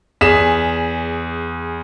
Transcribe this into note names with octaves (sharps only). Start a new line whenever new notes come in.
E2 G#4 B6 E7